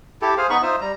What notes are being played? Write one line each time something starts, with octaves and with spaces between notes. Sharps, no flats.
E4 G4 A4
G#4 C5 F5
B3 D#4 B5 C#6
D#4 F4 C5 E5
G3 A#5